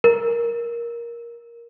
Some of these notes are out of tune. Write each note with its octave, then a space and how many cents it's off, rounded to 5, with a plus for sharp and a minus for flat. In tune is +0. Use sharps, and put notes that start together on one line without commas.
A#4 +10